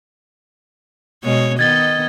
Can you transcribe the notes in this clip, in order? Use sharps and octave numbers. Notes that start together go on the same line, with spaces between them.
B2 G#3 C#5
D#3 B3 D#5 G#6 A6 G7